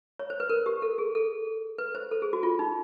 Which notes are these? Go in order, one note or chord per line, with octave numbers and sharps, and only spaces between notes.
C#5
C5
B4
A#4
G4
A4
G#4
A4
B4
C5
A4
G#4
F#4
F4
D#4